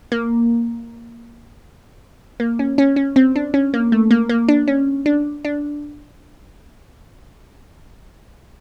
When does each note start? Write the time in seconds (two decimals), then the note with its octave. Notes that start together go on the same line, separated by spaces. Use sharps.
0.12 A#3
2.40 A#3
2.59 C#4
2.78 C#4
2.96 C#4
3.16 C4
3.36 D4
3.54 C#4
3.74 A#3
3.92 A3
4.11 A#3
4.29 A#3
4.48 D4
4.68 C#4
5.06 D4
5.45 D4